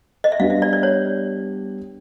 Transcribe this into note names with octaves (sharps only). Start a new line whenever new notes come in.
D#5
E5
G3 B3 D4 G4 F5
E5
D5
D5
C#5